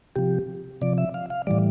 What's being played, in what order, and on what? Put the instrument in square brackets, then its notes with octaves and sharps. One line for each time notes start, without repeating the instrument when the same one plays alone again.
[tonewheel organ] C3 F3 G4
C3 F3 D5
E5
F5
F5
A2 E3 G3 D5